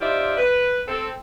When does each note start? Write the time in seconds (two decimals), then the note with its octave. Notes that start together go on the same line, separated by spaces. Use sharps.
0.01 D#4 F4 G4 C5 D5 E5
0.37 B4
0.87 C4 A4